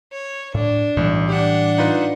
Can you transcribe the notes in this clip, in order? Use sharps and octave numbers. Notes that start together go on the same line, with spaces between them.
C#5
A2 D4
B1 A2 E3 G3
D4 G4 F#5
D#4 F4 B4